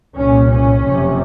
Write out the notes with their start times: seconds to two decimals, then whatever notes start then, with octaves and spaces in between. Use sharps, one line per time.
0.17 C2 A#2 C#4
0.50 C#4
0.82 F#1 F2 C3